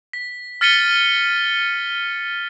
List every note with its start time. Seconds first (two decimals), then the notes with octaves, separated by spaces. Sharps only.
0.13 B6
0.61 F6 A6 B6 C#7 D#7 G7